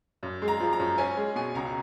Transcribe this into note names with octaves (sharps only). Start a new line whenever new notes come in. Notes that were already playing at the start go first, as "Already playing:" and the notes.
F#2
G#3
A#5
F3
A#5
F#2
C#4 G#5
G#3
B2 G#5
C#2 A#5